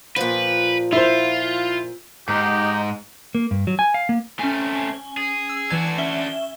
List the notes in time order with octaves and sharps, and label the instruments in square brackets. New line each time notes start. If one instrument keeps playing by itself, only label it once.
[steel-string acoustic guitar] A#2 F3 [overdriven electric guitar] B4
[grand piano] E4 C5 [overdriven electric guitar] F4
[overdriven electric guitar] G#2 [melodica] D#4 D#5 [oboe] G4
[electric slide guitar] A#3
G2
F#3
G#5
F5
A#3
[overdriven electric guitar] A3 C4 [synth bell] C#4 G#5
[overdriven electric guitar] G#4
[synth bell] E6
[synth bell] E3 G#5 G#6 [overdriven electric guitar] D4 F#4
[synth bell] C#4 E5 G7